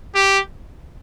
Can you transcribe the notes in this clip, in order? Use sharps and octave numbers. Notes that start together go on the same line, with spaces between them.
G4